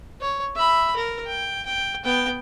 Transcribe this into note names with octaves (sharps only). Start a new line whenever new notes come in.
C#5
E5 B5
A#4
G5
G5
B3 G5